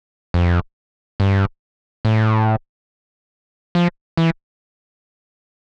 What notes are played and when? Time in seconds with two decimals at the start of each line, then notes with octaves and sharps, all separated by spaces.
0.34 F2
1.20 G2
2.05 A2
3.75 F3
4.17 E3